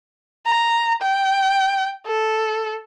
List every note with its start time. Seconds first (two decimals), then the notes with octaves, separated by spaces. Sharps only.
0.46 A#5
1.02 G5
2.07 A4